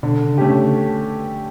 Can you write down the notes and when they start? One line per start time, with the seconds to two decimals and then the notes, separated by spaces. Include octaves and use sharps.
0.03 B2 D3
0.26 C#3
0.38 A3 C#4 G4
0.50 C#3